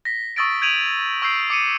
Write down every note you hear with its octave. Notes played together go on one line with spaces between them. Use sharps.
A#6 B6
C#6 D#6 E6 A6 A#6 D7
G6 G#6 D7 D#7 F7 F#7
C#6 E6 G6 C7 D7
D6 C#7 D#7